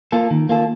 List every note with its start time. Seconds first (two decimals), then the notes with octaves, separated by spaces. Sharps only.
0.12 A#3 F4 A4
0.31 D#3
0.49 A#3 F4 A4